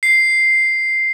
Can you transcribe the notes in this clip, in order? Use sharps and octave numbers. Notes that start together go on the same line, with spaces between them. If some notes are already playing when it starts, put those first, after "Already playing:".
C7